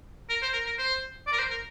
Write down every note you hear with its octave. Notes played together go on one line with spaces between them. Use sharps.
A#4
C5
A#4
A#4
C5
D5
A#4
C5
A#4